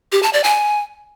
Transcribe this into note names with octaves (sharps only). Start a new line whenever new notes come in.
G4
A5
D5
G#5